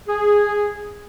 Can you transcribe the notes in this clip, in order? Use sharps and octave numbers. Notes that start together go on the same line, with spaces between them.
G#4